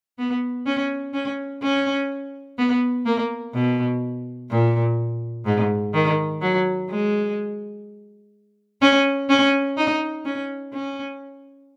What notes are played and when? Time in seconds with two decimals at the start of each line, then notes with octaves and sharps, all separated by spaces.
0.18 B3
0.66 C#4
1.14 C#4
1.62 C#4
2.58 B3
3.06 A#3
3.54 B2
4.50 A#2
5.46 G#2
5.94 D#3
6.42 F#3
6.89 G#3
8.81 C#4
9.29 C#4
9.77 D#4
10.25 C#4
10.73 C#4